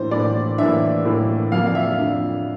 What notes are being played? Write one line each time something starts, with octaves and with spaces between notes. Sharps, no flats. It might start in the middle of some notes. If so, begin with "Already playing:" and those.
Already playing: A2 E3 A#3 D4 C5
A2 E3 A#3 D4 D5
A2 E3 A#3 D4 E5
A2 E3 A#3 D4
F2 D3 F3 A#3 D4 F5
F5
E5
F5
F2 D3 F3 A#3 D4